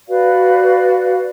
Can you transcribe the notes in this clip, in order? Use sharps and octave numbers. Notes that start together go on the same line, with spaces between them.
F#4 B4 D5 F5